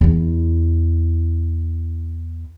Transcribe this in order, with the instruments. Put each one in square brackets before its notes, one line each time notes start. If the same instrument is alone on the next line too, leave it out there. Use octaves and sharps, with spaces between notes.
[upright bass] E2 E4